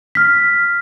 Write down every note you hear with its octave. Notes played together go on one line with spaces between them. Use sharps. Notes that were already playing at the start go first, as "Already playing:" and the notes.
F6 B6